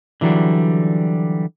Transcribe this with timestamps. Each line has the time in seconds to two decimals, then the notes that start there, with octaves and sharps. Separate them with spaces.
0.21 D3 E3 F#3 G3